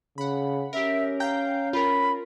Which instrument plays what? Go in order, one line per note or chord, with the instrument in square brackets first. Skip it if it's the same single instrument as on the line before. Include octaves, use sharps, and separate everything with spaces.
[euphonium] C#3 [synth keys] F#5 B5
[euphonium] C#4 [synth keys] G4 A#4 [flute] E5
[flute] F5 [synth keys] G5 A#5 G6
[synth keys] F4 A#4 [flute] B5